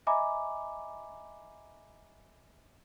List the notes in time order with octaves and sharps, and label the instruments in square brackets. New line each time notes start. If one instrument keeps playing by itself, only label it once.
[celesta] D#5 E5 G#5 A#5 B5 D6